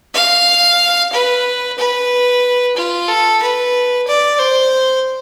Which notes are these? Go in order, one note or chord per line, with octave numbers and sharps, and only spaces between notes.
F5
B4
B4
F4
A4
B4
D5
C5